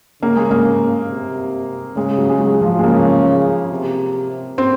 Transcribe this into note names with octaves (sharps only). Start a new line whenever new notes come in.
C#3 A#3
G#3
A#3
C3
C#3 G#3
F#3
G#3
F#3
F3
G#3
C#3 A#3
C3
C4